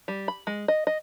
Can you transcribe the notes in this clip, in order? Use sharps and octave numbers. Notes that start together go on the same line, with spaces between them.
G3
B5
G#3
D#5
D#5